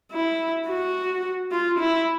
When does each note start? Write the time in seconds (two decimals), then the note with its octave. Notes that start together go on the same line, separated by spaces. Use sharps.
0.12 E4
0.68 F#4
1.52 F4
1.79 E4